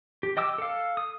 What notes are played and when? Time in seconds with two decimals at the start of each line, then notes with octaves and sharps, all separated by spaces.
0.23 G4
0.37 D#5 G5 D6 E6
0.58 A4 F5
0.97 D#6